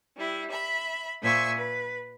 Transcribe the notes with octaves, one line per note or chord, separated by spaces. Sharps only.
G3 E4
E5 B5
A#2 C5 E5 G#5 C#6 E6
B4